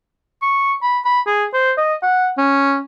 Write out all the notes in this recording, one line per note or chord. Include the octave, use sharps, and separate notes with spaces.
C#6
B5
B5
G#4
C5
D#5
F#5
C#4